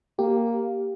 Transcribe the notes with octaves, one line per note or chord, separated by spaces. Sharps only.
A#3 G4